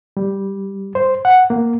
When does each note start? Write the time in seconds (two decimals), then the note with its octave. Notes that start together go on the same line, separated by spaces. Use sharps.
0.17 G3
0.95 C5
1.25 F#5
1.50 A#3